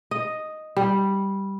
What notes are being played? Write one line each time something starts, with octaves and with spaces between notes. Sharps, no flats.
D#5
G3